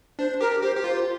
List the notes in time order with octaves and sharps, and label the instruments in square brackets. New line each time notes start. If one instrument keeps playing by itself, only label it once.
[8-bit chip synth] D4 [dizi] C5
[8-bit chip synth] G4 [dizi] A#4
[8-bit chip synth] G4 [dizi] C5
[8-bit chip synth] G4
[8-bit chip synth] F4 [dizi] C5